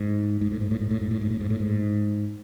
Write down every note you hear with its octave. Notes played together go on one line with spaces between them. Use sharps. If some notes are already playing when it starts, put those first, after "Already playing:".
Already playing: G#2
G#2
A2
G#2
A2
G#2
A2
G#2
A2
G#2
A2
G#2
A2
G#2